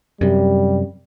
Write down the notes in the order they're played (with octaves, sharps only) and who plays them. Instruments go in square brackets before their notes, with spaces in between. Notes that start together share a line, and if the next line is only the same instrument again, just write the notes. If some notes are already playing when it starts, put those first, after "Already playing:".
[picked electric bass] F#2 C3 [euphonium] G3